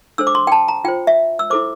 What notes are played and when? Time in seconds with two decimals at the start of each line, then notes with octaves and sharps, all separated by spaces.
0.18 D4 A4 C5 E6
0.27 D6
0.35 C6
0.47 G5
0.52 A5
0.68 A#5
0.84 F4 C5 G5
1.07 E5
1.39 E6
1.50 E4 A4 C5 D6